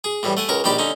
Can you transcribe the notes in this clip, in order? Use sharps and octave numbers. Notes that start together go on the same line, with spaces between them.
G#4
A2 E3 G3
A3 F#5 G#5
C#2 A#4 C#5 C#6
A#1 D#3 G4 D5 B5 D6
D3 C#4 D#4